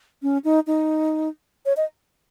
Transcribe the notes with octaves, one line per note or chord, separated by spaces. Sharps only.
C#4
D#4
D#4
C#5
D#5